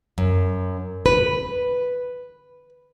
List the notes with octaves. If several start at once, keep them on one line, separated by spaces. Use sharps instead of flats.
F#2
B4